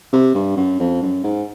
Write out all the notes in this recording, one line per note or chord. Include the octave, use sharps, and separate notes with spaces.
C3
G2
F#2
F2
F#2
G#2